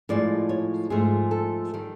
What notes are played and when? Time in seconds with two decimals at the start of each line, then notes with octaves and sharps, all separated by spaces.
0.09 A2 F3 G#3 D5
0.49 C#5
0.90 G#2 F3 A3 G#4
1.31 A4
1.74 D#3 G3